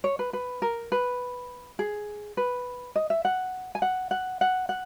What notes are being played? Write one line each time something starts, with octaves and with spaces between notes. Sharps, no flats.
C#5
B4
B4
A#4
B4
G#4
B4
D#5
E5
F#5
G#5
F#5
F#5
F#5
F#5